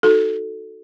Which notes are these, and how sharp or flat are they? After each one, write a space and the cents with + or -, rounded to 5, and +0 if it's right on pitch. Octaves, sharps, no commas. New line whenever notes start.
D#4 +0 F#4 +0 A4 +0